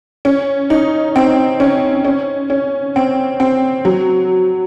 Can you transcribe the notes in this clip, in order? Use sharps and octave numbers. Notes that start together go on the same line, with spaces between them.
C#4
D#4
C4
C#4
C#4
C#4
C4
C4
F#3